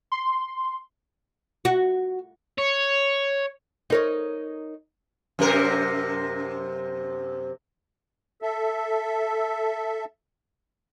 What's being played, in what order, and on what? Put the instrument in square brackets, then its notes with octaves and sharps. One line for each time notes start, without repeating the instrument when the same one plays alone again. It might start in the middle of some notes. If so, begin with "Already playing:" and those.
[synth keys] C6
[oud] F#4
[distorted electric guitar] C#5
[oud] D#4 A#4 C#5
[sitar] F#2 C3 A#4
[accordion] A4 E5